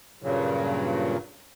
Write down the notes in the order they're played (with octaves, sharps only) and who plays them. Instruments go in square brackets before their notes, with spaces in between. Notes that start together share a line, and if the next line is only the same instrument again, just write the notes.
[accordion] G2 A#2 C#3 F#3